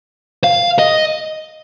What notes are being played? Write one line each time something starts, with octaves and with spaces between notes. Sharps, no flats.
F5
D#5